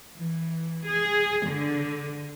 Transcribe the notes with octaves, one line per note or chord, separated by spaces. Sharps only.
E3
G#4
D3